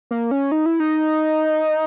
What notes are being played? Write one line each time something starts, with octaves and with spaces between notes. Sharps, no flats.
A#3
C#4
D#4
E4
D#4